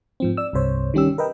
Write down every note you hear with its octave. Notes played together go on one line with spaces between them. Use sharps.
G#2 F3 C4
D5 E6
C2 G2 C3 C5 C#5
D#3 G3 C#4 G4 E6
A#4 B4 D#5 G5